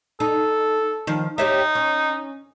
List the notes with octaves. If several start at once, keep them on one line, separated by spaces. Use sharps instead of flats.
D#4 A4
D#3 F3
D#4 G4 C#5 E5
C#4